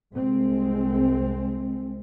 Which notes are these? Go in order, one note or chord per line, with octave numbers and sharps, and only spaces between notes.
C2 G#3 C4